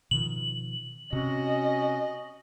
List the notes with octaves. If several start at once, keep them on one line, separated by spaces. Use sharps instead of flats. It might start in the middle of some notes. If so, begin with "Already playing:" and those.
B2 D#3 F3 F#7
C3 C#4 F#4 D#5